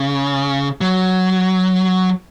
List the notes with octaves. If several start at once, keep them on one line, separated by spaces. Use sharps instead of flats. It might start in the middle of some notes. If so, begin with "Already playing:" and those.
Already playing: C#3
F#3